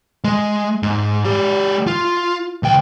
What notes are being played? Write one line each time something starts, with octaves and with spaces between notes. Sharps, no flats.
G#3
G#2
G#3 G4
F4
C#2 G5